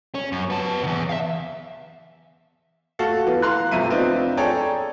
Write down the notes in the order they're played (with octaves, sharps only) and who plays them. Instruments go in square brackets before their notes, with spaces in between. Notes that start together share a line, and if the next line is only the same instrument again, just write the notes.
[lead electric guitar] C#4
F#2
B3 A5
E2 C3
E5 F5
[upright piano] A3 F#4 A4 F5
E3 B3
F5 A#5 C6 F#6
F2 C3 A3 E5 D#7
B3 C4 D4 D#4 F4
G#4 A4 C#5 D5 G5 A#5